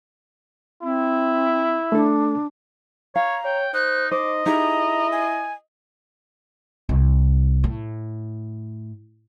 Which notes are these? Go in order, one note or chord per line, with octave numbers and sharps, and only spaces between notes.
C4 E4
A3 D4 A4
C#5 F5 A#5
C#5 G5
D#4 C5 F#6
D#4 C5 D#5 D6
D#4 E4 G4 G#4 A#5
G#5
C2
A2